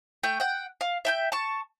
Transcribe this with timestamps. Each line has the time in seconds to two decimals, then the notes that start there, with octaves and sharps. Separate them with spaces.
0.23 A3 G5
0.40 F#5 G5
0.81 F5
1.05 E5 G5 G6
1.32 A5 C#6